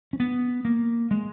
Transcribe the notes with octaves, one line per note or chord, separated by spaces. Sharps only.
C#4
B3
A#3
G#3